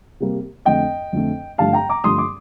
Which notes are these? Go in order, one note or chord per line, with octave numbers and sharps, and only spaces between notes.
C3 G3 A#3
F2 D3 A3 D#5 G5
F2 D3 A3
G2 D3 F3 A3 F5 A5
G5 A#5
A#5 D6
G2 D3 F3 A3 C6 D#6
D6